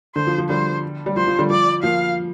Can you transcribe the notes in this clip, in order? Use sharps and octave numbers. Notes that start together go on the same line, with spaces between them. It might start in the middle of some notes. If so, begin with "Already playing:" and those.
D3 C5
F3
F3
D3 G3 C5
G3
F3 C5
F3
D3 G3
F3 D5
F3 A#3 F5